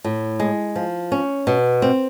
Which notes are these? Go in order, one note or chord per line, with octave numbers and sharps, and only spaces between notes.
A2
G#3
F3
C#4
B2
C4